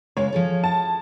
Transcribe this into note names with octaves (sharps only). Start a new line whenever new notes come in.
C#3 G#3 A#3 C#5
F3 G#4 A4
A5